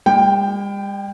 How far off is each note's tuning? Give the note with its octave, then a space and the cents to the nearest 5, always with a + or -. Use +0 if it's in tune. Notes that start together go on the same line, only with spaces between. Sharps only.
G3 +45 G5 +0